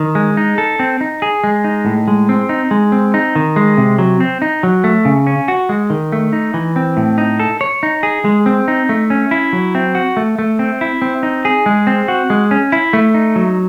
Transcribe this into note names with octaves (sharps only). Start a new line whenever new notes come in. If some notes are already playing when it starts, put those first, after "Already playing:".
Already playing: D#3
G#3
D#4
A4
C4
D#4
G#4
G#3
D#4
A2
G#3
C4
D#4
G#3
C4
D#4
D#3
G#3
C3
F#3
C4
D#4
F#3
A3
C#3
C#4
F#4
G#3
D#3
A3
D#4
E3
C4
A2
D#4
A4
C#5
D#4
G#4
G#3
C4
D#4
A3
C#4
E4
F#3
C4
F#4
A3
A3
C4
E4
C4
D#4
G#4
G#3
C4
F#4
G#3
C#4
E4
A3
D#4
F#3